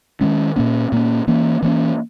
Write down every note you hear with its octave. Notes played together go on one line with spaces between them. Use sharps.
D#3 G#3 C#4
A#2 A#3 C#4
A#2 A#3 C#4
E3 A#3 C#4
E3 A#3 C#4